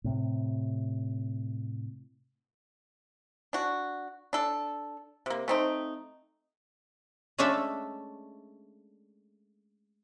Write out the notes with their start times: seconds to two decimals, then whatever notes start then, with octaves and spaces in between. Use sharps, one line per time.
0.04 A2 C3
3.53 D4 F#4
4.33 D4 A4
5.26 C3 A#3
5.48 A3 C4 D#4
7.38 G#3 A3 C#4 D4 A4 E5